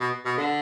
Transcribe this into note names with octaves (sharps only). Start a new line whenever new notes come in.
B2
B2
D3